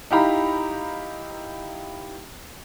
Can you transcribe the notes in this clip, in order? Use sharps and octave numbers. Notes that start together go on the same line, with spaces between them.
D#4 E4 G4 F5 A#5 B5